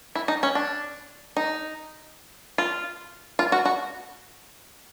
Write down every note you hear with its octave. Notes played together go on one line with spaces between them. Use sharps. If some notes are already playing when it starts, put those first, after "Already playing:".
E4
D#4
C#4
D4
D#4
F4
F4
F#4
F#4